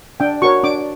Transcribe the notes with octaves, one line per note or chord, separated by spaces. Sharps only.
D4 G5
F#4 A#4 C#5 C#6
D4 D6